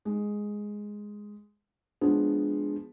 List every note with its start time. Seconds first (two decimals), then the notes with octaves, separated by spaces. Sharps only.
0.05 G#3
2.01 F3 G#3 B3 D4 G#4